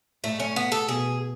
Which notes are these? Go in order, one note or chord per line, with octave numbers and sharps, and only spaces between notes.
A2 A3
C#4
B3
A4
B2 G#4